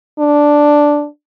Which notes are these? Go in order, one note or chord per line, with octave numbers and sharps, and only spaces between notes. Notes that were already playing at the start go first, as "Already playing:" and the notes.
D4